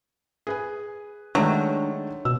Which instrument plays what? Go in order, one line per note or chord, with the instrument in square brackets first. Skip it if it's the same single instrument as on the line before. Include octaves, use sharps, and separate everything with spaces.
[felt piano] G#4 B4 G#5
[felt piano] D#3 G#3 A3 [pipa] F#3 [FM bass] D4
[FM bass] B2 [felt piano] E6